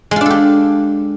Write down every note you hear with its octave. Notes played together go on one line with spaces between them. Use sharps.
G#3 D4 F4 G4 A4